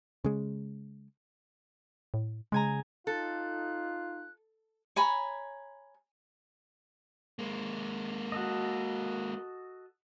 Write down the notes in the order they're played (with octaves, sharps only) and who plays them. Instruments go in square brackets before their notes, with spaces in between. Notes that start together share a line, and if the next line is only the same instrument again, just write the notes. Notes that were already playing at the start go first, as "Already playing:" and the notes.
[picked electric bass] C#3 G#3
[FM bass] A2
[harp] C#3 G#5 A#5 [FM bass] G#3
[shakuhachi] D#4 [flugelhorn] F4 [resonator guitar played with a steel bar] A4 [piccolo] F#6
[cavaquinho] C#5 G#5 A#5 B5
[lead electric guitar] G#3 A#3
[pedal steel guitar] F#4 A4 D#5